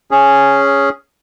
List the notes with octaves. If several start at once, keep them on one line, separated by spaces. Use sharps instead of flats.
C#4 G#4